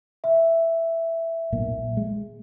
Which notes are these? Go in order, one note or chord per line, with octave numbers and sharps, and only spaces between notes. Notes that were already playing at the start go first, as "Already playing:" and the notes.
E5
B1 A#2 A#3
G#3